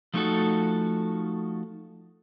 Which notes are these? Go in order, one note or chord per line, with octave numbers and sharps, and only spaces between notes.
F3 A3 D#4 E4 F#4 A4